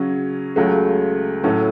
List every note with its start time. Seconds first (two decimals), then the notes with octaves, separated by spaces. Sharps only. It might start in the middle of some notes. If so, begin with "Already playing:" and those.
Already playing: C#3 F#3 C#4
0.56 C#2 C#3 F#3 A3
1.43 A2 F#3 C#4 E4 A4